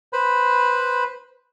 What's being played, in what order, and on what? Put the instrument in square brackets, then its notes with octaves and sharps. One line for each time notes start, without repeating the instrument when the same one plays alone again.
[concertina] B4 C5 B5